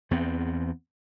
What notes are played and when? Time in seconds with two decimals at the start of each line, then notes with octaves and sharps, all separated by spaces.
0.11 E2 B3 C4